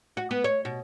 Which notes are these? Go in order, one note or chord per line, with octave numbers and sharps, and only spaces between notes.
F#4
B3
C#5
B2